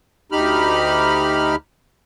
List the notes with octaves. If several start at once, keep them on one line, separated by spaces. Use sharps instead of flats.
D2 D#4 G4 B5 F6